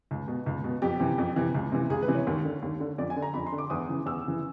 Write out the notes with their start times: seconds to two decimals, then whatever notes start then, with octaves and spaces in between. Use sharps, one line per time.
0.11 C#2
0.28 B2
0.46 C#2
0.64 B2
0.82 F2 G4
1.00 C3 E3
1.18 F2
1.36 C3 E3
1.55 C#2
1.72 C3 E3
1.90 C#2 G#4
2.02 B4
2.08 C3 E3
2.15 C#5
2.27 D#2
2.45 D3
2.62 D#2
2.80 D3
2.98 F2 D5
3.10 G#5
3.16 D3
3.22 A#5
3.34 F2 B5
3.47 C6
3.52 D3
3.58 D6
3.70 E2 D#6
3.89 C#3 E3
4.06 E2 E6
4.25 C#3 E3